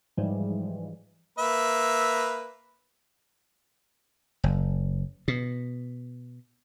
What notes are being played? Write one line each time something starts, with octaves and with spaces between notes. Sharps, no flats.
G#2 E3 F3 G3 G#3
A#3 B4 E5
F#1
B2